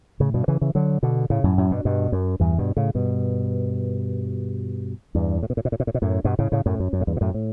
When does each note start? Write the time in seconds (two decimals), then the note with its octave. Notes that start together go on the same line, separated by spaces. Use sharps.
0.20 A2 C#3
0.34 G2 B2
0.48 C#3 E3
0.61 C#3 E3
0.75 D3 F#3
1.03 B2 D3
1.30 A2 C#3
1.44 F#2 A2
1.58 F#2 A2
1.71 G2 B2
1.85 G2 B2
2.12 F#2
2.40 E2 G2
2.58 G2 B2
2.77 A2 C#3
2.95 G2 B2
5.15 E2 G2
5.43 A2
5.50 B2
5.57 A2
5.65 B2
5.72 A2
5.80 B2
5.87 A2
5.94 B2
6.02 F#2 A2
6.24 G2 B2
6.39 A2 C#3
6.52 A2 C#3
6.66 F#2 A2
6.80 F#2
6.93 F#2
7.01 A2
7.07 E2 G2
7.17 B2
7.21 F#2 A2
7.34 A2